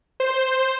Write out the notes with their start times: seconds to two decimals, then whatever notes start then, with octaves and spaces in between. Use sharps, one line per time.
0.20 C5